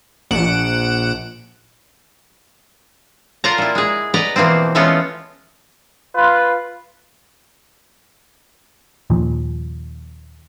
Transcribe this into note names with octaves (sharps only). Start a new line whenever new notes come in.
A#1 F#5 D7 E7
F4 A#4 D5 F#5 A5 A#5
A#2 E4
G#3 G#4
B4 D5 D#5 F#5 A#5
B2 E3 F3 A#3 C4
E3 G#3 A3 B3 C#4 F4
F4 B4
D#2 A#2 F3